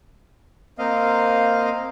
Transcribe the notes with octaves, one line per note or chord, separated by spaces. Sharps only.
A#3 C4 D#5 F5